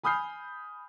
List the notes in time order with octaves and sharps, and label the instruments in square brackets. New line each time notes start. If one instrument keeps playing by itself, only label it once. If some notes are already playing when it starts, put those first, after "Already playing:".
[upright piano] G#5 B5 D#6 F6 G6 C7